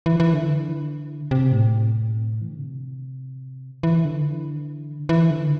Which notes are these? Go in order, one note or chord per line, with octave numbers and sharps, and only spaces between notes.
E3
E3
D3
C3
A2
E3
D3
C3
E3
D3
E3
D3